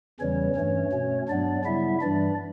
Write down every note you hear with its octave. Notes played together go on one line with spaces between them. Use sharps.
E2 C#3 E3 G3 C#4 C#5
G2 E3 A3 C#4
B2 A3 C#4
G2 F#3 B3 D4 D5
C#3 G3 B3 E4 E5
G2 E3 G3 D4 D5